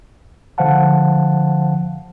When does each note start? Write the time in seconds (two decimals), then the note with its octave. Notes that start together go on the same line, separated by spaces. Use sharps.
0.58 D3 F3 C5 F5 F#5 A5